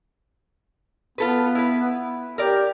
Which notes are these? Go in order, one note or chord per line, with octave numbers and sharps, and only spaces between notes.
B3 F4 A4 B4
E4 B4
G4 A#4 D5